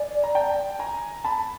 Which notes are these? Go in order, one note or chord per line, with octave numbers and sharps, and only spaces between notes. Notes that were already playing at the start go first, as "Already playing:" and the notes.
Already playing: D5 G#5
A#5
G5 A5
G#5 A#5
A5 B5